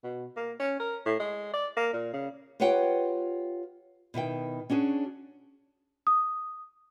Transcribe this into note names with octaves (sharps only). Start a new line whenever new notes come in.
B2
A#3
C#4
A#4
A2
G#3
D5
A#3
A#2
C#3
F4 G4 B4 C#5 F#5 G5
B2 D#3 E4 G5
C#4 D4 F#4 G#4
D#6